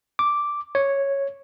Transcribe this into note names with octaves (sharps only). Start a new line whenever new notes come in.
D6
C#5